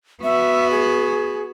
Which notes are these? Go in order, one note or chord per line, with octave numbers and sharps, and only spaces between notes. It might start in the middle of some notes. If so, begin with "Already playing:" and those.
B3 F#4 E5
G#4